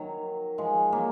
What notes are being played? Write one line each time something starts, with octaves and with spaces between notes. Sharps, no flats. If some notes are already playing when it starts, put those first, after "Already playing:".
Already playing: D#3 F#3
F3 G#3
F#3 A#3